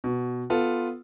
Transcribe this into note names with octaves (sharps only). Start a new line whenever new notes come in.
B2
B3 F4 A4